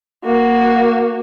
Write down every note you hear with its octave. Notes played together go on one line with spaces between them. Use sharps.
A#3 F#4